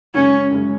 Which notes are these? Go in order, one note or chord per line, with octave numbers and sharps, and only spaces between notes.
F#2 C#3 G#3 C#4
F#2 C#3 G#3